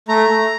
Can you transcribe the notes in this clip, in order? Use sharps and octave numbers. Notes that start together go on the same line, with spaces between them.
A3 A#5
A3